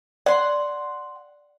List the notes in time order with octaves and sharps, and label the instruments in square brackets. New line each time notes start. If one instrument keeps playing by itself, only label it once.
[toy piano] D5 [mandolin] F#5 C6